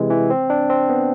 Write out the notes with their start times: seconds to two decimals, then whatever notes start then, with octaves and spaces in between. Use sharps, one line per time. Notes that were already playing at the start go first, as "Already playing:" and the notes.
Already playing: C3 E3 G#3
0.10 E3
0.30 C4
0.50 D4
0.70 C4
0.89 B3